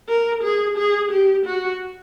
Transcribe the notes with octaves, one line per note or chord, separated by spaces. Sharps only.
A#4
G#4
G#4
G4
F#4